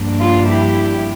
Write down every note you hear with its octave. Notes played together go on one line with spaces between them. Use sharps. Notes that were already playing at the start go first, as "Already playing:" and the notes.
Already playing: G2 F3 A#3 D4
F4
E4 G4